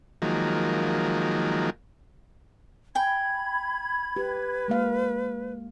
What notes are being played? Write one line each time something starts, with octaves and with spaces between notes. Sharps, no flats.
D#3 F3 F#3 G#3 A#3
G5 G#5 B5 G#6
G4 B4
G#3 A#3 F5